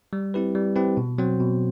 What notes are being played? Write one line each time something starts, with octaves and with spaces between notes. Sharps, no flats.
G3
C4 E4 G4 B4
G3
C4 E4 G4 B4
B2
F#3 C4 F#4 C5
B2